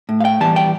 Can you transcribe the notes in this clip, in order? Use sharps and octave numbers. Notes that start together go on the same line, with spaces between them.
A2
F5
G5
E3 G3 B3 A5
G5